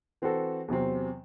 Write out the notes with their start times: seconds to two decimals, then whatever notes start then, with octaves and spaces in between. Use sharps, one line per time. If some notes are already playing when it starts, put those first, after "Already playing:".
0.22 E3 C4 F#4 A4
0.68 E2 C3 F#3 C4